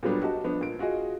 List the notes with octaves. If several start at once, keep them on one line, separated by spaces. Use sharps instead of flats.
A#2 F#3 G3 B3 D4 G4
F#4 G4 D#5 A5
F3 B3 D4
A#2 D7
F4 F#4 G#4 D#5